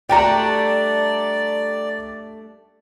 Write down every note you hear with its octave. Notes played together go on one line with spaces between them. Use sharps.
G3 A3 D4 D5 G5 A#5